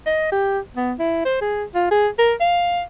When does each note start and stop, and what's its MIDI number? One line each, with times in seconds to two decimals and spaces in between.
0.06 0.29 75
0.32 0.59 67
0.77 0.94 59
0.99 1.23 64
1.25 1.40 72
1.41 1.64 68
1.75 1.88 65
1.91 2.08 68
2.19 2.34 70
2.40 2.82 77